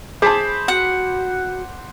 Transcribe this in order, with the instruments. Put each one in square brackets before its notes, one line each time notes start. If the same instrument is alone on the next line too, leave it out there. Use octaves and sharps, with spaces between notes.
[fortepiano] G#4 A5 [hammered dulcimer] C5 B5 D6
[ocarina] F#4 [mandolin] F#5